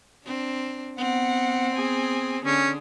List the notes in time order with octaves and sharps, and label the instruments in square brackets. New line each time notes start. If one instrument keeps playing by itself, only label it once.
[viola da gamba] C4 D4
[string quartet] B3 F#5 [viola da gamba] C4
[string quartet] B3 G#4
[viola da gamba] D3 [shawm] C#4 [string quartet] G#4